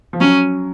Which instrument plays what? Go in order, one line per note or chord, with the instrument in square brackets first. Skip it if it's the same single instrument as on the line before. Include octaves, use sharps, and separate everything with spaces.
[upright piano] F3
[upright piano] F#3 [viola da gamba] C#4